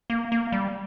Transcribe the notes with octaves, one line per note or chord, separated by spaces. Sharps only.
A#3
A#3
G3